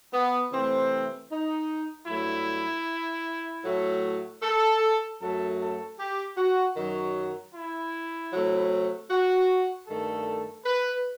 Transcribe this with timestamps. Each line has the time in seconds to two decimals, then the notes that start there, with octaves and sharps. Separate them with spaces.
0.12 B3
0.51 C3 E3 A3 C4
1.30 D#4
2.08 G2 F#3 A3 E4
3.63 A2 F#3 A3
4.42 A4
5.19 F#2 F#3 A3 A4
5.59 A4
5.98 G4
6.37 F#4
6.76 F#2 D#3 F#3
7.54 E4
8.32 C3 F#3 A3
9.10 F#4
9.88 G2 D#3 A3 A4
10.65 B4